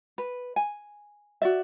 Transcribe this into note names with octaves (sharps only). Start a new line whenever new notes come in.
B4
G#5
F#4 D5 E5